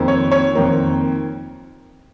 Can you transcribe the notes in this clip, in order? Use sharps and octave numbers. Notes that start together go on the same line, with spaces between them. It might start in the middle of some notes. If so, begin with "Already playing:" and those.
Already playing: F2 D#3 A#3
C#5
C#5
F2 D#3 A#3